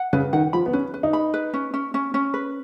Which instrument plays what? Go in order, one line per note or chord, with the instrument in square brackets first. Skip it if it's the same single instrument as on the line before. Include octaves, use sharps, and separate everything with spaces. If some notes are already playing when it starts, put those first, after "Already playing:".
Already playing: [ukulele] F#5
[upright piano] C#3 [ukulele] B4
[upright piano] D#3 [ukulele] F#5
[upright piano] F3 [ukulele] B5
[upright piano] B3
[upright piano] C#4 [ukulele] B4
[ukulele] B4
[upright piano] D#4
[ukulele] B5
B4
C#4
C#4
C#4
C#4
B4